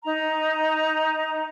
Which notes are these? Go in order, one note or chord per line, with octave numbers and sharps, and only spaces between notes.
D#4 A#5